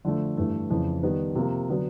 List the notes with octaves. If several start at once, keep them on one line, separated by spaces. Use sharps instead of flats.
D3 F3 A3
G2 E3 A3
F2 C#3 E3
D#3 G3 B3
C3 F3 A#3
D3 F#3 B3 D4